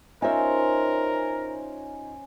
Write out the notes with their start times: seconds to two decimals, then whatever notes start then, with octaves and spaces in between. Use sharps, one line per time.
0.22 C#4 D#4 F4 A#4 C5 E5 G#5